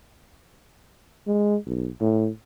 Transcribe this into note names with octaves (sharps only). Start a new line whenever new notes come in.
G#3
B1
A2